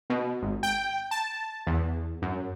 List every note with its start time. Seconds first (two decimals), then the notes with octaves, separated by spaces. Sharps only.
0.10 B2
0.42 G#1
0.63 G5
1.11 A5
1.67 E2
2.22 F#2